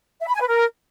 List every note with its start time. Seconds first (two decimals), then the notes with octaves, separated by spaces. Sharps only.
0.21 E5
0.28 B5
0.34 G#5
0.41 B4
0.48 A#4